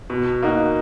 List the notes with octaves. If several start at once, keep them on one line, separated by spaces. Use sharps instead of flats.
B2
A#3 D#4 F#4